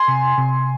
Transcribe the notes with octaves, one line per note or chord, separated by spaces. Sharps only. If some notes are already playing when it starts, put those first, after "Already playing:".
Already playing: G#5 C6
C3
C3